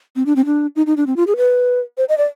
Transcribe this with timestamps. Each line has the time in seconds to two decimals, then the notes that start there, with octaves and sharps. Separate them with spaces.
0.16 C4
0.26 D4
0.36 C4
0.45 D4
0.76 D#4
0.87 D#4
0.97 D4
1.07 C4
1.16 F4
1.27 G#4
1.37 B4
1.98 C5
2.09 D#5
2.18 D5